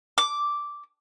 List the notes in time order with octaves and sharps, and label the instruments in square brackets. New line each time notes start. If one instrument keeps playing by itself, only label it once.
[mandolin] D6